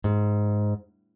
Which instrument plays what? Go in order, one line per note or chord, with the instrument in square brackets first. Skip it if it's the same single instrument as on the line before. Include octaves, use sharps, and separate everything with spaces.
[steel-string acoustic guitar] G#2